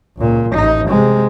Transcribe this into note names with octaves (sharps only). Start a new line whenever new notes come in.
C#2 A#2
A1 D#4
C3 G#3